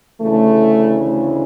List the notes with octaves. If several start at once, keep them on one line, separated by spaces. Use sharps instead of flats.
D2 C#3 E3 A3